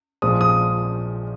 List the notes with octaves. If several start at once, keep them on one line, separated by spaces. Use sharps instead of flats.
A#1 A#2 F3 G#3 D#6
D#6